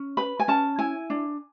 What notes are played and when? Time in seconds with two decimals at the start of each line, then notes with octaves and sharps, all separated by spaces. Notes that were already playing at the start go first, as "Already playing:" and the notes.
Already playing: C#4
0.17 B4 B5
0.39 G#5
0.48 C#4 A5
0.79 E4 G#5
1.10 D4